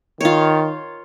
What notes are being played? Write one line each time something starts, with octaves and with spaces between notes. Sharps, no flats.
D#3 F4 C#5